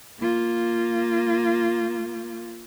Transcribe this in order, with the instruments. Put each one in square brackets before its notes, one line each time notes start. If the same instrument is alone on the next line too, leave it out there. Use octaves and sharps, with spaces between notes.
[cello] A#3 F4